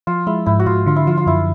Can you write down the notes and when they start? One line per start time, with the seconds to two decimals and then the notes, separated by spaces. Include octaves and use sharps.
0.07 F3 F4
0.27 G#3 E4
0.46 G#2 E4
0.60 F#4
0.66 G#2 F4
0.86 D3 F4
0.96 E4
1.07 F3 F4
1.18 F4
1.27 F#2 E4